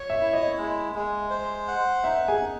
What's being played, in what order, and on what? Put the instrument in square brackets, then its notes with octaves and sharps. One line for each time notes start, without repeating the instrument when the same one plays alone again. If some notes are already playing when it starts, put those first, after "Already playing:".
Already playing: [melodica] C#5
[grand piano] E5
[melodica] E4
[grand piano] D#5
[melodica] G#3
G#3
C5
F#5
[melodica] D#4 [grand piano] E5
[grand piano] G#4 G#5
[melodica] D#4